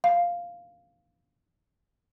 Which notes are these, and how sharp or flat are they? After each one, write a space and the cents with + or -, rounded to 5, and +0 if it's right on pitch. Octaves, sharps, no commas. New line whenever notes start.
F5 +0